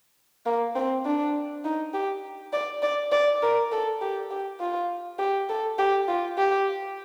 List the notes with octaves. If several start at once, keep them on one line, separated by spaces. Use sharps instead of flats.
A#3
C4
D4
D#4
G4
D5
D5
D5
A#4
A4
G4
G4
F4
G4
A4
G4
F4
G4